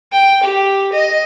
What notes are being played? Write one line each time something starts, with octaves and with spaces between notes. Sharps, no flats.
G5
G4
D#5